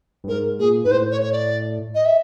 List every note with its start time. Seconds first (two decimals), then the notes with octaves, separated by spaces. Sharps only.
0.24 G2
0.28 G#2 A#4
0.59 A#2 G#4
0.84 G#2 B4
0.91 A2 C5
1.12 C#5
1.22 C#5
1.32 D5
1.95 D#5
2.05 E5